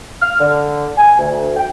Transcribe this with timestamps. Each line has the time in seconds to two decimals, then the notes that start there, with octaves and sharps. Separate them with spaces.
0.21 F6
0.39 D3
0.97 G#5
1.19 D2
1.57 G5